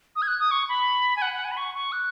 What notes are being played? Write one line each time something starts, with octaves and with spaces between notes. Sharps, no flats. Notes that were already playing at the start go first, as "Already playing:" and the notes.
D#6
G#6
F#6
D#6
C#6
B5
G#5
F#5
F#5
G#5
B5
C#6
C#6
F#6